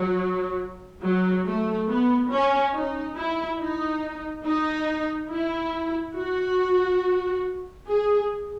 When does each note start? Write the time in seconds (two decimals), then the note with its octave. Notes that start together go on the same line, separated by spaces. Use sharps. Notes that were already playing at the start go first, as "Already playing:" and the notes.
Already playing: F#3
1.02 F#3
1.45 A3
1.88 B3
2.30 C#4
2.73 D#4
3.16 E4
3.59 D#4
4.45 D#4
5.30 E4
6.16 F#4
7.88 G#4